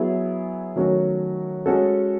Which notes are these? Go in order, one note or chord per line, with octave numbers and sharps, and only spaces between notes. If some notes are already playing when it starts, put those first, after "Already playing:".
Already playing: F#3 B3 E4 G#4
D#3 F#3 A3 C#4 F#4
G#3 C#4 F#4 A4